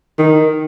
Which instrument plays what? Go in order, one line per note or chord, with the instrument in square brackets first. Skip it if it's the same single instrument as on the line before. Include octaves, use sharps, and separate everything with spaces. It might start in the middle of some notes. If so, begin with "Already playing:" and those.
[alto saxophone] D#3